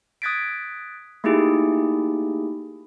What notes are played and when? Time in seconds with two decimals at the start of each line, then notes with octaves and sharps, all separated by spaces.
0.22 D#6 F#6 G#6 A6 B6 D7
1.24 A3 A#3 D#4 E4 G4 G#4